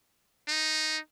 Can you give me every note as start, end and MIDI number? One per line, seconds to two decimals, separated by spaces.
0.48 0.98 63